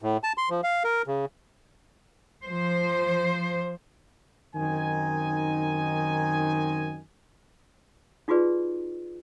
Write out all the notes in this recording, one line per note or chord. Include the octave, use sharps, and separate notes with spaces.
A2
A5
C6
F3
F5
A#4
C#3
F3 C5
F#2 D#3 C4 D#4 D#5 G#5
D#4 F4 F#4 G#4 B4 D5